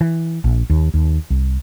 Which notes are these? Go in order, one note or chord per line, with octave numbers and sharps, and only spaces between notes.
E3
A#1
D#2
D#2
C2